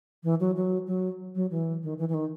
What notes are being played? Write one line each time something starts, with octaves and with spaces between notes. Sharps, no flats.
E3
F#3
F#3
F#3
F#3
E3
D#3
E3
E3
D#3